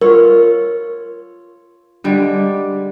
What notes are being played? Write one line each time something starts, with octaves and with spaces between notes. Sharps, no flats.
F4 A#4 C#5
D3 G3 G#3